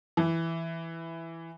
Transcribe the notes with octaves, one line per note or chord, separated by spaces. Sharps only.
E3